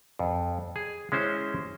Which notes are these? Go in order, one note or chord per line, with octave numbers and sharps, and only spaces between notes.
F2
G#4
G#3 C#4 E4 C5